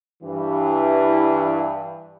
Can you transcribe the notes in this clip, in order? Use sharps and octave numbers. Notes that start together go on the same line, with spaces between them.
G2 E3